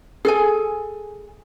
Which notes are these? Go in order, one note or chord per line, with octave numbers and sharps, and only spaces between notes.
G#4 A4 G#5